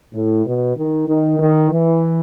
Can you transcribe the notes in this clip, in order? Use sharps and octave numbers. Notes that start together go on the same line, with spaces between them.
A2
B2
D#3
D#3
D#3
E3